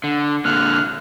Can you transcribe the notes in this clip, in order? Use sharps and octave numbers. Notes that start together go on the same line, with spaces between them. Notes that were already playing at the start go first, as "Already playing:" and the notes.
D3
A#2 D3 F6 F#6